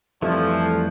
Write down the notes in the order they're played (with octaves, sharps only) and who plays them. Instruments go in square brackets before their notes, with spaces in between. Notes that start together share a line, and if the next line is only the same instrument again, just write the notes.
[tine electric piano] F2 G3 A3 [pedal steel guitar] E3 E4 [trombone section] F3